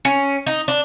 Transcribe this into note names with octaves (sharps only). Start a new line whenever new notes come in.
C#4
D#4
D4